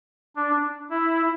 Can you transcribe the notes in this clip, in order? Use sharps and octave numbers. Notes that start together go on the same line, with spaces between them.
D4
E4